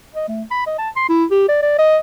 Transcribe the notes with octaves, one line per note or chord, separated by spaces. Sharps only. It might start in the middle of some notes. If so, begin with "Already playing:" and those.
D#5
A3
B5
D#5
A5
C6
E4
G4
D5
D5
D#5